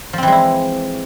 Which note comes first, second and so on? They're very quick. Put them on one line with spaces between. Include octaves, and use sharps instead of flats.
F3 C4 E3 G#3 E4